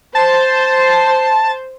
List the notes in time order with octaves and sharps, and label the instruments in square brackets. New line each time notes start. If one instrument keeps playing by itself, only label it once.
[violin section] C5 [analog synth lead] A5